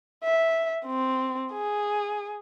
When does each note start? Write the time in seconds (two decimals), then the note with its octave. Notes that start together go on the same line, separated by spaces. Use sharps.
0.23 E5
0.86 C4
1.53 G#4